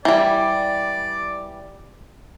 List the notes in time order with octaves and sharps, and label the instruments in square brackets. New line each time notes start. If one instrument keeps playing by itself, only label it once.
[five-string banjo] E3 G3 [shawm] D5